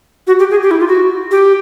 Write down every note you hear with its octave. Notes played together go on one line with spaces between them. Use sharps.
F#4
G4
G#4
G4
E4
F4
F#4
G4